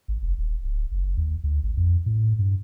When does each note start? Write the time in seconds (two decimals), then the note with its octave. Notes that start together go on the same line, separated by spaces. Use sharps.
0.08 G#1
0.23 F1
0.38 D#1
0.64 D1
0.92 F#1
1.17 D#2
1.44 D2
1.63 G#1
1.77 F2
2.06 A2
2.39 G2